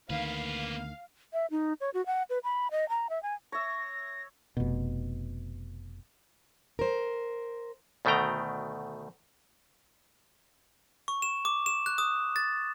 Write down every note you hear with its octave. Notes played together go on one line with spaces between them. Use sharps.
D2 D#3 A#3 B4 F5
E5
D#4
C#5
F#4
F#5
B4
B5
D#5
A#5
E5
G#5
C#5 E5 A#6
F1 B2
A#4 C5
D2 B2 D#3 A3 G5 A#5
C#6
E7
D6
E7
F#6
D#6
A6